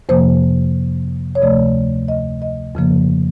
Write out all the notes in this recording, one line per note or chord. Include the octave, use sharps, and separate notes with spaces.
F2 C3 F3 A#3 C5
C#5
D2 C3 F3 A3 D5
D#5
D#5
F2 C#3 F3 A#3